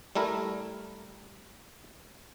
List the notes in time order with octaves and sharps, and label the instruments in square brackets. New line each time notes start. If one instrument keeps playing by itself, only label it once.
[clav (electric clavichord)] G3 A3 E4 A#4